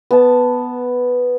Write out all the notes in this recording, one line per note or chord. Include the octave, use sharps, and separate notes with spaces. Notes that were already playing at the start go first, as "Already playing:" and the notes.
B3 A5